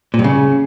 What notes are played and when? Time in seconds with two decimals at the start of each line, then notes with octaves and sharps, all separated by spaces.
0.14 A#2
0.19 G2
0.24 C#3